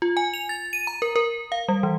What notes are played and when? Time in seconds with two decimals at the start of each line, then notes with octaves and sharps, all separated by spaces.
0.02 F4
0.17 G#5
0.34 F7
0.49 A6
0.73 D#7
0.87 A#5
1.02 A#4
1.16 A#4
1.52 F5
1.68 G3
1.83 E3